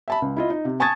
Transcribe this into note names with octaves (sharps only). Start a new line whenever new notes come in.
E5 A5 B5
C#2
E4 F4 D#5
D#4
C3
G#5 A5 C#6 D#6 G#6 A6